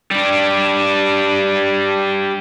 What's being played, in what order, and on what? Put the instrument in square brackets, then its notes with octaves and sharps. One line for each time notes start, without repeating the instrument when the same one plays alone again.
[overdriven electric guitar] G3 D4